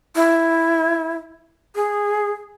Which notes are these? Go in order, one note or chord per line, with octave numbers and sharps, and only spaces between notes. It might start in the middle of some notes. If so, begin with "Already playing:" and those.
E4
G#4